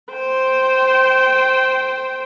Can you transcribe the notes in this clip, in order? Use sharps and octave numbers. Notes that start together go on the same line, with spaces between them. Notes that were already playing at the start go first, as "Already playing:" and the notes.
C5 G5